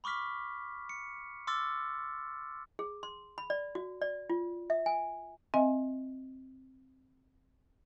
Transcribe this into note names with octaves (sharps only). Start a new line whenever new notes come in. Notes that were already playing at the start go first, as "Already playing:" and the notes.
B5 C#6 D6 F6 B6
C#7
C6 D6 E6 F6 A6
G#4
C6
B5
D5
F#4
D5
F4
E5
G#5
C4 D#5 E5 G#5